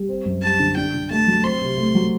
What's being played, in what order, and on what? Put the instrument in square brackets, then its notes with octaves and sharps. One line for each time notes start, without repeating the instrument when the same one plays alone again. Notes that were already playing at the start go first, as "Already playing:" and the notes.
Already playing: [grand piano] G3
C4
F#2
[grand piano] G3 [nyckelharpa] A5
[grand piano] D3
[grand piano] D4 [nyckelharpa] G5
[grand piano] D3
[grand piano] A3 [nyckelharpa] A5
[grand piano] F#3
[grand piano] C4 [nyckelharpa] C6
[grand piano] C3
A3
F#3